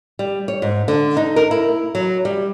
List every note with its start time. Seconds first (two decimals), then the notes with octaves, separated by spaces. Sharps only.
0.19 G3
0.48 C#5
0.62 G#2
0.88 D3
1.17 D#4
1.36 A#4
1.51 E4
1.95 F#3
2.25 G3